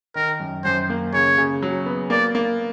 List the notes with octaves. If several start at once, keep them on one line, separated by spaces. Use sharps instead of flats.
D#3 A#4
F#2
F#2 C5
A#3
C#3 C#5
C#3
F#3
B3
A#3 D5
A#3